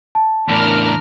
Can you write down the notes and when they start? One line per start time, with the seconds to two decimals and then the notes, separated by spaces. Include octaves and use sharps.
0.15 A5
0.49 E2 A2 D4 A#4 F6